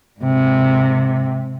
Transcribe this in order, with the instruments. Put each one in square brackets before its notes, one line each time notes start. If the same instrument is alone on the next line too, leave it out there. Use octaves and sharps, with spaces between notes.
[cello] G#2 C3